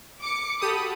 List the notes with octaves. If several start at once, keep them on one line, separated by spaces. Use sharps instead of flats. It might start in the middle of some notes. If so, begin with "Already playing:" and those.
D6 C#7
F#4 G4 A4 B5 D#6